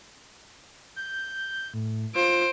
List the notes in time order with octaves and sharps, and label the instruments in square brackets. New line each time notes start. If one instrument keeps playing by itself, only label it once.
[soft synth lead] G6
A2
[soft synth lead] F4 [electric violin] C5 D7